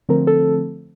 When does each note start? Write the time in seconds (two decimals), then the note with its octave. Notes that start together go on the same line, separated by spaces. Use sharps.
0.09 D3 F3 A3 C4 A#4
0.27 A4